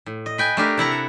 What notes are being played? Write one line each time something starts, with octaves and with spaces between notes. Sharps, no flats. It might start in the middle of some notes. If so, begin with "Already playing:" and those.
A2
D#5
B4 G5 G#5
A3 D4 G4 A#4
C3 E4 F#5 A#5
A4